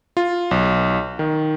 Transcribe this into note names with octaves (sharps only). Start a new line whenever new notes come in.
F4
B1
D#3